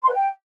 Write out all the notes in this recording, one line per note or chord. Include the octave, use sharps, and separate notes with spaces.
C6
B4
G5